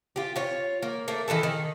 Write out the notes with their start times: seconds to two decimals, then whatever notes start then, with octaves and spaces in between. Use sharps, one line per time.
0.16 F4 G4
0.36 F4 C#5
0.83 A#3
1.08 A3 A#3
1.28 D#3 E3 G4 A4
1.43 D#3